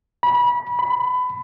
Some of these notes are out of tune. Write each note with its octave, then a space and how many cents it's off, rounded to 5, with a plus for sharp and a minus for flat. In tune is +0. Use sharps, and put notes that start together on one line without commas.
B5 -25
B5 +25